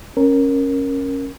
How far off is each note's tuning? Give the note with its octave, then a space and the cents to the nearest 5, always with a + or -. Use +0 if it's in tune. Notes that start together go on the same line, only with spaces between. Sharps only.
C#4 -15 A#4 +0